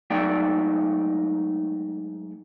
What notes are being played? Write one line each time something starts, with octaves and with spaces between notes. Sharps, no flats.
G#2 F#3 A3 D#4 D5 G5